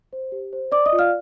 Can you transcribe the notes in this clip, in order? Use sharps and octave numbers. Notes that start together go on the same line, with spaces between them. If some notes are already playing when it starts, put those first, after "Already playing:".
C5
G4
C5
D5 D6
D#5 D#6
F4
F5 F6